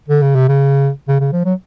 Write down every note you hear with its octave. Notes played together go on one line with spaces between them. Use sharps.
D3
C#3
C3
C#3
C#3
C#3
F3
F#3